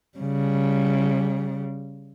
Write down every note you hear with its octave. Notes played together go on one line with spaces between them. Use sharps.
C#3 G3